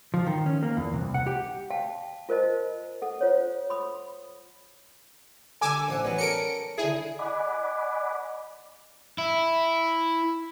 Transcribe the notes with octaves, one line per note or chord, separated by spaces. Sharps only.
F3
D#3
C#4
A#3
E2
C2
F#5
G4
F5 G5 A5
F4 A#4 C5 D#5 A5
A4 F#5
F4 C5 C#5
B5 D#6
D3 G3 G#5 D6 E6
A1 C5 F#5
F#3 G3 B3
C#4 A4 A#4 C#7 D7
D3 E4 G#4
D5 D#5 F#5 G#5 B5 D6
E4